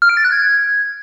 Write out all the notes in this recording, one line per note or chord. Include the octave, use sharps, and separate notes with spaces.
F6
D7
A6
F#6
G#6